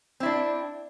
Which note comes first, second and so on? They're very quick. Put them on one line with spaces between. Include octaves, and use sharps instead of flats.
C4 E4 D4